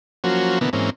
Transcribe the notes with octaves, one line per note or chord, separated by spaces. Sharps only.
F3 F#3 A#3 C#4 F#4 C5
B2 D3 E3 A#3 B3
G#2 E3 A#3 C4 C#4